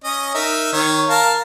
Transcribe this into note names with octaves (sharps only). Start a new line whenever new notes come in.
C#4 D#5 D#6
D#4 A#4 E5
D#3 C#5
A#4 F5 A5